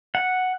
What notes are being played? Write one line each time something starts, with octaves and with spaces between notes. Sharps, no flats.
F#5